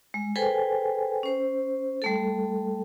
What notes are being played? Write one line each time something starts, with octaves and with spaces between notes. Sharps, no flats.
G#3
G#4 A4 B4 C5 G5 G#5
C#4 C5
G3 A3 A4